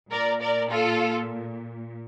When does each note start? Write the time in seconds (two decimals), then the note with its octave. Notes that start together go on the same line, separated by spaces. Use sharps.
0.11 A#2 A#4 D5
0.41 A#4 D5
0.70 F4 A4